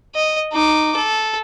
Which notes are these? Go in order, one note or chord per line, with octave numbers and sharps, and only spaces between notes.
D#5
D#4 D6
A4